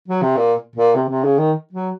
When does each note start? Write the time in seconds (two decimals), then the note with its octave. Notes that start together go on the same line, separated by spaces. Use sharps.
0.08 F#3
0.22 C3
0.37 A#2
0.76 A#2
0.95 C3
1.09 C3
1.24 C#3
1.38 D#3
1.73 F#3